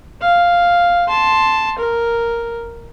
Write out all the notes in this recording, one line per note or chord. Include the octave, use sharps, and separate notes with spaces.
F5
A5 C6
A#4